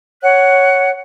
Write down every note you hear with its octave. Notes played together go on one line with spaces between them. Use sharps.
C#5 F#5 F#6